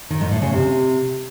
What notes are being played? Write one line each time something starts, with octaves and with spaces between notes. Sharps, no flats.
D#3
G#2
A2
C#3
C3